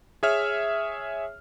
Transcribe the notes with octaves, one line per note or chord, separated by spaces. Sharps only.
G#4 C#5 E5 F6